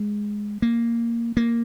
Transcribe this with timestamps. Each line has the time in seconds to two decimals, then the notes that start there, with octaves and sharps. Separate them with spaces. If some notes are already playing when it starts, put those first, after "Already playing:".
Already playing: G#3
0.62 A#3
1.37 A#3